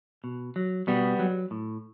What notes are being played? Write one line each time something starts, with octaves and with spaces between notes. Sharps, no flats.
B2
F#3
B2 G3 B3
F#3
A2